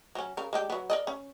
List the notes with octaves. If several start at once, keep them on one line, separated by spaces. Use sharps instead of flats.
F#3 C#4
C#3 A#4
G#3 D4 G4
F#3 B3
A#4 D5 D#5
C#4